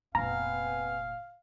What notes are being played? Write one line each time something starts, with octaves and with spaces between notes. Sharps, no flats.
F1 A#2 B3 C4 F5 G#5 A#5